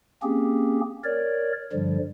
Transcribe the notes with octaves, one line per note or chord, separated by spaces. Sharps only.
A#3 C4 C#4 G4 G#4
A#4 C#5 D5
G2 D3 F3 G3